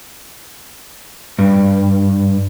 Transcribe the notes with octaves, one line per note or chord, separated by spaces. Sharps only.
G2